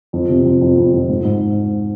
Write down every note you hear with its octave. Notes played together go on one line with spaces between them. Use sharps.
F2
C3
F2
F2
F2
F2
G#2
G#2